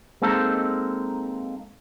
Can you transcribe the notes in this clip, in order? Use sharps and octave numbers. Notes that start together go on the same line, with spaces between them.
G#3 A#3 C4 D#4 A4